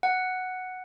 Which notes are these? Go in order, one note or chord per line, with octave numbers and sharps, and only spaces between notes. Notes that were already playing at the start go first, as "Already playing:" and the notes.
F#5